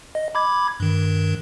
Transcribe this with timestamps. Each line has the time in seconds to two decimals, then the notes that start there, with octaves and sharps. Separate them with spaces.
0.15 D#5
0.35 B5 D6 G#6
0.80 G2 D#3